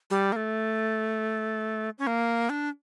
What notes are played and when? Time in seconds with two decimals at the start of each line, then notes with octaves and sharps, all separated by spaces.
0.10 G3
0.32 A#3
0.36 A3
1.98 C#4
2.07 A#3
2.49 D4